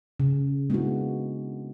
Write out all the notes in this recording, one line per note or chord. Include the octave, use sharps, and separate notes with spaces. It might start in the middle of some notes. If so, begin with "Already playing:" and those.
C#3
G#3 A#3 B3 D4 E4 F#4